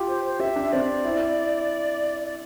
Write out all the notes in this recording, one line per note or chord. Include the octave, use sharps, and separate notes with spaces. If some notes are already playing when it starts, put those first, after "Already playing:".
Already playing: F4 G4
C5
C5
G4 E5
D4
C4 D5
E4
D5